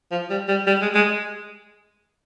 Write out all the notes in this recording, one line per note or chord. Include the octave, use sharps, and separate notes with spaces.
F3
G3
G3
G3
G#3
G#3